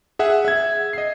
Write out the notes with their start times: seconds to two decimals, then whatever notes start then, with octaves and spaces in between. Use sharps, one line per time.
0.19 G#4 E5 F#5
0.45 E5 G#6
0.93 D#5 C7